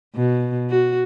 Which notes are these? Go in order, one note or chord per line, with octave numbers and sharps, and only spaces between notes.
B2
F#4